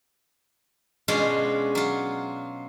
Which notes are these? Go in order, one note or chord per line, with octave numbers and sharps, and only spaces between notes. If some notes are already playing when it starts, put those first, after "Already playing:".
B2 G#3 C#4 D4 F4
F#3 F4